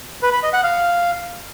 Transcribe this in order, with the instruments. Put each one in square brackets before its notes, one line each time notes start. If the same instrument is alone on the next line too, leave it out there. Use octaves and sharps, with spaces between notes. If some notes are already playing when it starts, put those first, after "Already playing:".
[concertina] B4
B5
D#5
F#5
F5